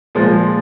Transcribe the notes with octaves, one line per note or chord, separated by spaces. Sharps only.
A#2 F3 G#3